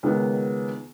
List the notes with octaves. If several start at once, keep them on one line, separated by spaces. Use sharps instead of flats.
C#2 D#3 B3